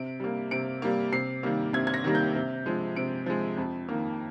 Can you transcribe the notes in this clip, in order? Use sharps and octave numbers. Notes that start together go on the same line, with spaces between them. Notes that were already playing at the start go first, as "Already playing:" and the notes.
Already playing: C3 D7
G3 A#3
C3 D7
G3 A#3
C3 C7
D#3 G3 A#3
C3 G#6
G#6
A#6
D#3 G3 A#3
G6
C3
F3 G#3
C3 D7
F3 G#3
F2
D#3 A#3